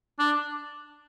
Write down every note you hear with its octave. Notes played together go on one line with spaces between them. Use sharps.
D4